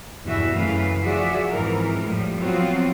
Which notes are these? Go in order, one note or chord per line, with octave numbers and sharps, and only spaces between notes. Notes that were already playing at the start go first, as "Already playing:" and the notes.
E2 G2 B2 E3 F#4 E5
F#2 C#3 E3 A3 B4 F5
F3 F#4 G#4 D5 E5
F2 G#2 E3 F3 A#4
A2 F3 G3
F3 F#3 B3 C4 F4 F#4